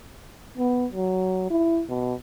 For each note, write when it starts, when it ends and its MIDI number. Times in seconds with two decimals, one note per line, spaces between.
0.58 0.86 59
0.92 1.48 54
1.50 1.83 64
1.89 2.14 47